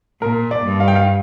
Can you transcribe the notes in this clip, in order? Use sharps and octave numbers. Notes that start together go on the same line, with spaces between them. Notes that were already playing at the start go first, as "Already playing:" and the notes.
A#2 A#4
D5
G2
F5
G5
F5